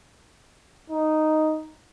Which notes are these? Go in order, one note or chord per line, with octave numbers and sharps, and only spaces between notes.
D#4